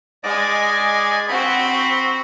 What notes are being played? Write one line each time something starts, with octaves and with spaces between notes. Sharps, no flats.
G#3 D5 D#5 G#5 D6
C4 F#4 B5